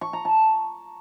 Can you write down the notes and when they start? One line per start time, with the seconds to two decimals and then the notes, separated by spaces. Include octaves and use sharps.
0.01 C#6
0.13 A#5
0.25 A5